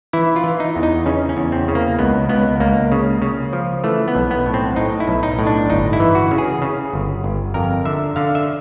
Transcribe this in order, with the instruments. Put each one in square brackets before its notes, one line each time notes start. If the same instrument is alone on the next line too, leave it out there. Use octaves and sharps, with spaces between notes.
[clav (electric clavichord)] E3 E4
F4
E3
D#4
E2
D#4
C#3 C#4
C#4
E2
C4
C#3
A#3
C#2 B3
C#2 B3
C#2 A#3
C#3
C#3
F3
E3 A3
B3
B1
B3
A2
C4
A2 D#4
E4
B1
D#4
A2
D4
G1 D#4
E4
E3
F#4
C#3
G#4
C#3
G1
G1
F2 A#4
D3 E5
D3 F5
E5